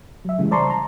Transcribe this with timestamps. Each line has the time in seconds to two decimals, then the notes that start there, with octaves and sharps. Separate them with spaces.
0.25 F#3 E5
0.39 C#3 E3 G3 G#3
0.51 C5 D5 A5 A#5 C6 C#6
0.70 A#5 C6